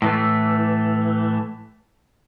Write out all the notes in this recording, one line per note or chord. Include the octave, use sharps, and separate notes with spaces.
A2 E3 A3